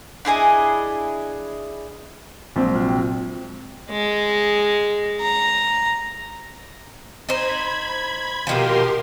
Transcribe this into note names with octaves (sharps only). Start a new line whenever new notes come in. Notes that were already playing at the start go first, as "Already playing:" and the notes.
D4 E4 G#4 D#5
A#1 C3 F#3 G#3 C4
F4 F#4
G5
G#3
A#5
D#4 C5 B5 G#6
B2 D#3 F3 G4 A#4 C6